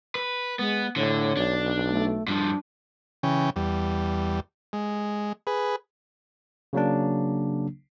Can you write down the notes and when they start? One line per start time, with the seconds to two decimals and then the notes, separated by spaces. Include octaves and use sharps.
0.15 B4
0.59 G#3 B3
0.96 A2 D3 C#5
1.37 B1 D4
1.89 A3
2.28 G2 F3 D4
3.23 C#3 E3 C#4 G5
3.56 E2 G3
4.73 G#3
5.47 G#4 B4
6.73 C#3 F#3 A#3 D4